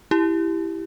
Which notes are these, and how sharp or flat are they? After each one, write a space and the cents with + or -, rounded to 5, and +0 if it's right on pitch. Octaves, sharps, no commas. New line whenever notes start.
E4 +0 G4 +0